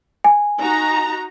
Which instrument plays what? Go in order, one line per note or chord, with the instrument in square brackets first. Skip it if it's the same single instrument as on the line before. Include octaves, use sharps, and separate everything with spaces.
[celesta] G#5
[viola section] D#4 F#4 A#5